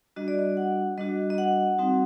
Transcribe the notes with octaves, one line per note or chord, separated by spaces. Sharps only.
G3 D4 F#4 D#5
D5
D#5
F#5
G3 D4 F#4 D#5
D#5
F#5
G3 C4 D#4 F#4